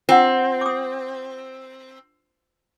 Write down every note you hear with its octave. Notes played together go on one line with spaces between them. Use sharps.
C4 F4 F#5
D6 D#6